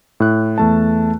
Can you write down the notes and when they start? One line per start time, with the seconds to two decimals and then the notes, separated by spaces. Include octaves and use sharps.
0.20 A2 F#6
0.58 E2 A3 A5